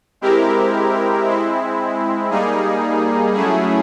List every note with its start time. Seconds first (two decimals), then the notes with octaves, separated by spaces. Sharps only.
0.21 G#3 C4 E4 G4 A#4
1.26 G#3 C4 E4
2.30 G3 A#3 D#4 G#4
3.35 F#3 A3 C#4 E4 G#4